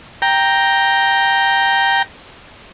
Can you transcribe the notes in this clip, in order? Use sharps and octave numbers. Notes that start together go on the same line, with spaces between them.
G5 A#5